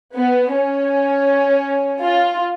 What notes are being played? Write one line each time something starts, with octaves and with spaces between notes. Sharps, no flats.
B3
C#4
F4